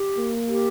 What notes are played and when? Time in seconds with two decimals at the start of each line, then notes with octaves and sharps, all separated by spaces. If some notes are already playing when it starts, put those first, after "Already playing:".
Already playing: G4
0.18 A#3
0.48 G4